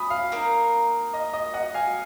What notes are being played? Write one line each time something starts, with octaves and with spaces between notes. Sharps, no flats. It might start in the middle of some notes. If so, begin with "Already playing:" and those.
Already playing: B5 D#6
F5
A#3 D#4 A#4
D#5
D#5
D#5 F#5
F5 G#5